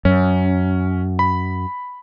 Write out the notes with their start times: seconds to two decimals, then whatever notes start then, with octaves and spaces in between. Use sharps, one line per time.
0.05 F#2 C#4
1.19 B5